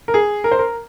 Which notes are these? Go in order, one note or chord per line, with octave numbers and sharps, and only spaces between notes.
A#4
G#4
A#4
C5
A#4